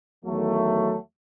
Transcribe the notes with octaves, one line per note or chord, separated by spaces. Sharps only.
E2 D#3 F#3 A3